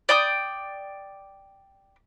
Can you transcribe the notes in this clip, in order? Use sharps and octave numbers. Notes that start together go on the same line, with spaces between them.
D5 G5 D#6